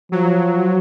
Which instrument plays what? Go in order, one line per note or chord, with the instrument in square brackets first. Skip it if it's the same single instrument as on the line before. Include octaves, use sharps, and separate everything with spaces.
[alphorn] F3 [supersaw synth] F#3